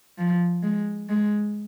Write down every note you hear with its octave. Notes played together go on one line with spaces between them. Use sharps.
F3
G#3
G#3